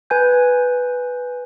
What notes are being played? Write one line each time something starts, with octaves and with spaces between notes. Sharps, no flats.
B4 G#5 G6